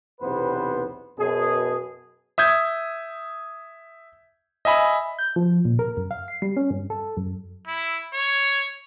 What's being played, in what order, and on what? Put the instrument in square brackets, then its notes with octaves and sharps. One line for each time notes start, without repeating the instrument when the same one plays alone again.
[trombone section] B1 E2 C3 B3 B4 C5
F#2 B2 G#4
[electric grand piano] E5 D#6 G6 G#6
D#5 E5 G#5 B5
[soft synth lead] G6
F3
A#2
A#4
F#2
F5
C7
G3
C#4
G2
A4
F#2
[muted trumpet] E4
C#5